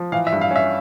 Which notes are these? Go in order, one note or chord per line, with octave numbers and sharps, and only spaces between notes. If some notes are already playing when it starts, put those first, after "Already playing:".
Already playing: F3
E3 F5
E5
G2
F5
C#4 E5